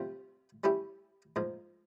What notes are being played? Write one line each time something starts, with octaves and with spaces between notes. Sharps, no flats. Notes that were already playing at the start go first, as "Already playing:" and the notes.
Already playing: C3 G3 C4 F4
G3 C#4 E4 G4
G#2 F3 A#3